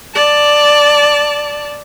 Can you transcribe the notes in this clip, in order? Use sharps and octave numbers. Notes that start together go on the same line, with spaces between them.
D5 A5